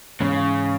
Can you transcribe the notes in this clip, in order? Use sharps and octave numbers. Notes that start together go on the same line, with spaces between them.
G#2 C#3 E3 G#3 B3